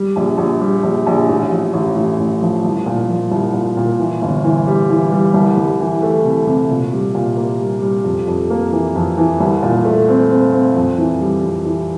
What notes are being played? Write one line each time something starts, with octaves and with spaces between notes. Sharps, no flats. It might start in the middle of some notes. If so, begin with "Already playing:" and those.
Already playing: G3
A#1
A#1
G3
A#1
A#1
A1
F3
A1
A2
A1
F3
C2
A#2
F3
C2
A#2
A#2
E3
G1
E3
G3
E3
G3
C2
C2
E3
A3
C3
C3
A#2
G3
A#2
A#3
G3
G3
F2
F2
A#3
E3
F2
E3
C2
A#2
A3
C4
C4
C4
F2
E3
G3
F2
E3